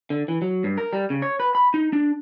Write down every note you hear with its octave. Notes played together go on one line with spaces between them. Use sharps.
D3
E3
F#3
G2
A#4
G3
C#3
C#5
B4
B5
D#4
D4